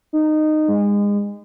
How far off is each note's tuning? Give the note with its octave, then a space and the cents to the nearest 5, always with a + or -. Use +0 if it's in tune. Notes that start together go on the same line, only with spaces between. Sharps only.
D#4 -15
G#3 -30